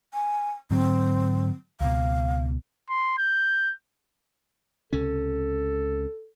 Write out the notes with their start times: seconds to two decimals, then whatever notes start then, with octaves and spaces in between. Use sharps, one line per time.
0.14 G#5
0.71 G#2 D3 F#3 C4
1.81 C#2 B2 F5
2.89 C6
3.18 G6
4.93 C#2 C3 C#4 A4